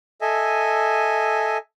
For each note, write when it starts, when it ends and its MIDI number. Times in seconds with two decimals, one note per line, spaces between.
0.21 1.58 69
0.21 1.58 75
0.21 1.58 76
0.21 1.58 80